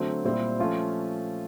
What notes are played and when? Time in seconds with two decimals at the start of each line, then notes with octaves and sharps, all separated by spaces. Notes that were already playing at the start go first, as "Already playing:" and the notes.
Already playing: D3 F#3 A3 C4
0.24 A#2 G3 C4 E4 G4
0.59 F3 A3 C#4 F4